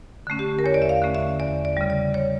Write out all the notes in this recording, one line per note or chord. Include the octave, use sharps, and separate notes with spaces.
D3 A3 C#4
G4
A#4
E2 C#5
D5
E5
F5
D3 A3 C#4
E5
E2 D5
D5
C#3 G3
D5
C#5